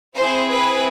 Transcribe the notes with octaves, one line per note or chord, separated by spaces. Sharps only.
C4 E4 G#4 C5
B4